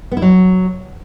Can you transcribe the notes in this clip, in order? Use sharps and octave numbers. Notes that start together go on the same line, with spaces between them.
B3
E4
F#3